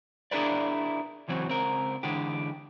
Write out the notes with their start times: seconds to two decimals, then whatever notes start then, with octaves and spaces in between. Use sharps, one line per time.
0.31 D4 E4 G#4 A#4 B4 D5
1.28 C#2 E3 F#3 C4
1.48 C#2 C4 A#4
2.03 D3 E3 G#3 G4